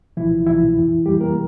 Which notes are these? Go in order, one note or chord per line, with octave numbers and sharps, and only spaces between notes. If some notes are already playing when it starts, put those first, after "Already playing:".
C2 A#2 E3 F3 E4
C2 A#2 E3 F3 E4
F2 E3
F2 E3 G3 G4
A#3 A#4